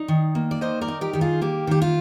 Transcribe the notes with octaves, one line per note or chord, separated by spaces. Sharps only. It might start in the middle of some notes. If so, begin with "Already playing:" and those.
Already playing: D#4 D5
D#3
A#3
D5
D#3 C5 D#5
A#4 D5
D#4
G4 A#4
D#3 G4
F4 G#4
A#3 G4
D#3 G4
F4